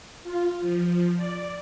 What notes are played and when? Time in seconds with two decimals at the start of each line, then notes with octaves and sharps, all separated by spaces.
0.23 F4
0.60 F3
1.17 D5